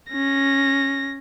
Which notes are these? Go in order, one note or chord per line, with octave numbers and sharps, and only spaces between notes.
C#4 A#6